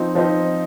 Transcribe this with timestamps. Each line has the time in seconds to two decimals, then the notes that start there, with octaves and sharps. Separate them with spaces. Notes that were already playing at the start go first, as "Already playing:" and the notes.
Already playing: F3 C4 D#4
0.15 F3 C4 D#4